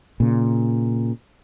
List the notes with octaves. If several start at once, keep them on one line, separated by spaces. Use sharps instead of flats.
A#2 C#3